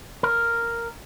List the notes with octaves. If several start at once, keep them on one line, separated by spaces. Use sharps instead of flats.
A#4